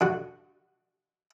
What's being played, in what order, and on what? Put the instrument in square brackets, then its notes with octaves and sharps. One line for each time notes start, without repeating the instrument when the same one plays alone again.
[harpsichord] D3 F#4